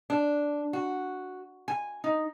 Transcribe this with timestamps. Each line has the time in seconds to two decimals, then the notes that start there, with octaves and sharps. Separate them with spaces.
0.10 D4
0.73 F#4
1.68 G#5
2.04 D#4